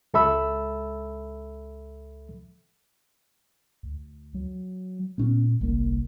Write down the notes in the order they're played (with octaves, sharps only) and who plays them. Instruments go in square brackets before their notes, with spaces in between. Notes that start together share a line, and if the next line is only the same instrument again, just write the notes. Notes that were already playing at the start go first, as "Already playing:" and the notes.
[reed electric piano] C#2 A4 E5 B5 E6
[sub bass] D2
F#3
[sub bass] A#2 [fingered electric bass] B3 C#4
[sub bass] G1 [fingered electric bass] C2 A#3